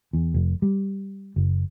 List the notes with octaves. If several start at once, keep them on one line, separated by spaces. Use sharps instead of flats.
E2
F1
G3
F#1